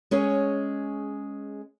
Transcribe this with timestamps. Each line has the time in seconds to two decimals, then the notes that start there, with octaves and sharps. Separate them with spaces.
0.11 G#3 C#4 G#4 C#5